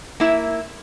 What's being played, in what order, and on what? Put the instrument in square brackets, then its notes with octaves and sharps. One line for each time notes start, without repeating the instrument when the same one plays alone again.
[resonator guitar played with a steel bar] A#3 E4 E5